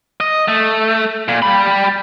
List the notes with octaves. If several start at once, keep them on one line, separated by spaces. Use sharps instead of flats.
D#5
A3
A#2
G3 B5